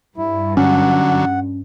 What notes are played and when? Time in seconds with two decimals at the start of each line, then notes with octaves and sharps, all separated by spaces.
0.18 G2 E4
0.57 D3 F#3 C#4 F#5